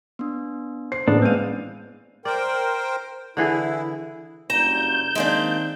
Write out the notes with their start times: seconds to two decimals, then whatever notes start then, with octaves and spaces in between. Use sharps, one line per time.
0.19 B3 D4
0.92 C5 C7
1.08 A1 A#3 B3 D4 G#4 B4
1.22 G#3 B3 C4 F5 D#7
2.25 A#4 C5 D5 G5
3.37 D3 E3 E4 G#4
4.50 F#1 G2 A#5 G6 E7
5.15 D#3 G#3 A#3 C4 D4